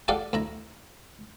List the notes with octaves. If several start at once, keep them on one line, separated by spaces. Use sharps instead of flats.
F4 G4 A4 D5 F5 F#5
D2 E4 A#5